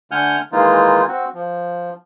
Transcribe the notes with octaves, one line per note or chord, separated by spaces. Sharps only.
D3 A3 F#5 G#5 F6 G6
D#3 E3 G#3 A#3 D#4 F4
C4 F#4
F3